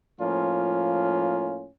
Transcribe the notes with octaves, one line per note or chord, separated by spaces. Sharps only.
A2 F3 A#3 C#4 F4